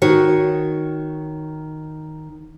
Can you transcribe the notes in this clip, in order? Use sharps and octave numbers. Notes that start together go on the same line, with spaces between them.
D#3 F#4 C#5